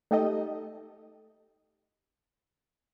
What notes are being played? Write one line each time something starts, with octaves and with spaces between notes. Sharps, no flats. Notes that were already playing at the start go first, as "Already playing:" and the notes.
A3 D#4 G4 A4 D#5